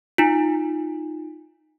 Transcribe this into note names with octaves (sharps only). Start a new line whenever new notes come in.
D#4 F4